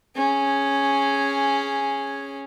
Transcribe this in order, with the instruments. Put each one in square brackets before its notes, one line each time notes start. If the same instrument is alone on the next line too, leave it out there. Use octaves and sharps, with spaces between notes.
[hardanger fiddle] C#4 G#4